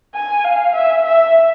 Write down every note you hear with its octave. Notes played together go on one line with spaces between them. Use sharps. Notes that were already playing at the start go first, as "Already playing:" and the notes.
G#5
F5
E5
E5